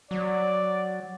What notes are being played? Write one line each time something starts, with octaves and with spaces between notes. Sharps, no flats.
F#3 D5